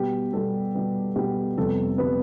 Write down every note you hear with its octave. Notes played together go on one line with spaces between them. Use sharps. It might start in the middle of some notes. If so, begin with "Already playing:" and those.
Already playing: B2 G3 B3 G4
B2 G3 B3 A4
B2 G3 B3
B2 G3 B3 G4
F2 C3 G3 B3 A4
C3 G3 B3 B4